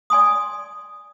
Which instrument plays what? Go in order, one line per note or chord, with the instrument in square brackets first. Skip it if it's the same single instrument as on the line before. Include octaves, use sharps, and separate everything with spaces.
[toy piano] D5 G#5 C6 D#6